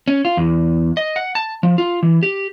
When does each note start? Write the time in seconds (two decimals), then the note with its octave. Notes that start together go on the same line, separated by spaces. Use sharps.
0.08 C#4
0.25 F4
0.37 E2
0.97 D#5
1.16 F#5
1.35 A5
1.63 F3
1.78 F4
2.03 E3
2.23 G4